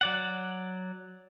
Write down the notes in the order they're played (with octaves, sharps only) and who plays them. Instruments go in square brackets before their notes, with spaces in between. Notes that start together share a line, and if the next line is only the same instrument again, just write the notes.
[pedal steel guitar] F#3 D5 F#5